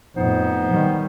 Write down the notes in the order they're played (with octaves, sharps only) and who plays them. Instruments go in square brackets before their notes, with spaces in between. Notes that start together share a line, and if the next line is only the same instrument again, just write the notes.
[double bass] F2 A2 [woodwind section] B3 D#4 C5
[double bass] D#3 G3